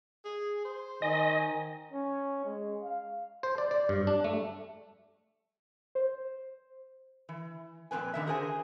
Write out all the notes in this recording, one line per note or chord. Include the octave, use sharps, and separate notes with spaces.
G#4
C5
D#3 D#5 G#5
C#4
G#3
F5
C5
D5
D5
G2
D4
A3
C5
E3
F2 A#2 G3 C4 B4 G#5
D3 D#3 E5
F#4 G#4 A#4 C5 D#5 G#5